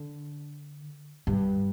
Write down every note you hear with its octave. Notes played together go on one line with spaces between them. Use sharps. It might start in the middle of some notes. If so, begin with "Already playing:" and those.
Already playing: D3
G2